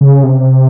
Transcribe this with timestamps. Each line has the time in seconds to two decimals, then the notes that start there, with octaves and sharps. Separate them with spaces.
0.01 C#3
0.23 C3